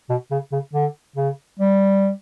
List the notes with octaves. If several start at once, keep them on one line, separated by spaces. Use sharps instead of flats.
B2
C#3
C#3
D3
C#3
G3